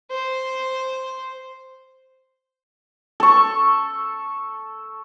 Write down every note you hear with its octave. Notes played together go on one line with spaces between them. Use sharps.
C5
A4 C#6